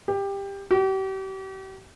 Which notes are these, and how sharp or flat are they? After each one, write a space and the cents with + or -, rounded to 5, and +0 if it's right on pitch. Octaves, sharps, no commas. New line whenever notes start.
G4 +15
G4 -40